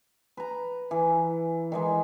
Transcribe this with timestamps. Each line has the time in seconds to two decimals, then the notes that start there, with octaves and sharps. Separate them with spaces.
0.37 B4 A#5
0.91 E3
1.72 D#3 E3 G#3